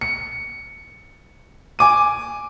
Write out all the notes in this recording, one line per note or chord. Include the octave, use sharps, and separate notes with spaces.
C#7
G#5 D6 D#7